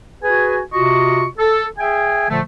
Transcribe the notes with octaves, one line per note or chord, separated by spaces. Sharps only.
F#4 G#4 B4 G#5
C3 F4 F#4 D#5 C#6
A4
G#4 E5 G5 G#5
A#2 D3 F3 A3